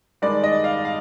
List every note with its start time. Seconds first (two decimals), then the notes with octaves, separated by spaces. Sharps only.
0.22 G2 D#3 G#3 D#4 D5
0.44 D#5
0.64 F5
0.85 F5